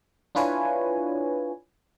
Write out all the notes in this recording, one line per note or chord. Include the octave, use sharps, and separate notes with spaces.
D4 E4 F4 B4 C#5 G#5